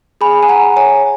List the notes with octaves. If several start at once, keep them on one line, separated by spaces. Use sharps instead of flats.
G#4 G#5 B5
G#5
F#5 A#5
C#5 G#5